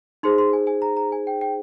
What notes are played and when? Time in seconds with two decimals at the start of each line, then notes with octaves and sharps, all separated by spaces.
0.23 D#4 G#4 C5 C6
0.38 C6
0.53 G#5
0.67 G#5
0.82 A#5
0.97 A#5
1.12 G#5
1.27 G5
1.41 G5